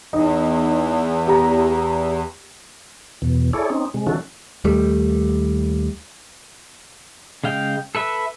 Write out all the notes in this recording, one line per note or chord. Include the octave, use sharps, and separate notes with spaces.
E2 D#4
G4 A#5
E2 B2
E4 G#4 A4 C#5 D5
C4 C#4 D#4
C3 G#3
D#3 E3 C#4 F#4 A4
D#2 G3 A3
C#3 G#3 F5 G5
A4 B4 E5